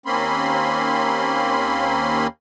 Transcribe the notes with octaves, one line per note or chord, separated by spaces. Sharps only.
D#2 A#3 C4 C#4 B5 C6